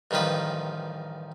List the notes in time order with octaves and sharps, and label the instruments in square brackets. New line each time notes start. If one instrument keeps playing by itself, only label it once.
[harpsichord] A1 G2 D#3 F3 B4